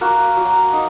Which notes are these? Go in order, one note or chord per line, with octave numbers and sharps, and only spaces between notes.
A#3 F#4
F#3
D#4